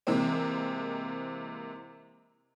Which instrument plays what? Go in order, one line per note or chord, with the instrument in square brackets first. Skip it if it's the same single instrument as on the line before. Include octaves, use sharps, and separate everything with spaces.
[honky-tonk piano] C3 E3 G#3 A#3 C4